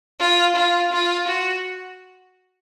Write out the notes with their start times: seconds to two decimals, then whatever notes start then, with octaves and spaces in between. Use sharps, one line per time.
0.20 F4
0.56 F4
0.92 F4
1.27 F#4